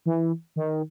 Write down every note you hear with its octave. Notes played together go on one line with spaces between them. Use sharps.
E3
D#3